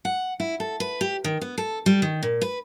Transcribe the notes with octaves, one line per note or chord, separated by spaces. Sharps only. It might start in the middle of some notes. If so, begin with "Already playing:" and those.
F#5
E4
A4
B4
G4
D#3
B3
A4
G3
D#3
A#2
B4